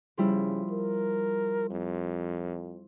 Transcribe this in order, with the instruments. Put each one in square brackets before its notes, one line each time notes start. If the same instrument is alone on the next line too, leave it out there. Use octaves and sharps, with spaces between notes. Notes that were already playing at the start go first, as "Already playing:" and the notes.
[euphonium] C#3 [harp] F3 G3 E4
[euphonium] A#4
F2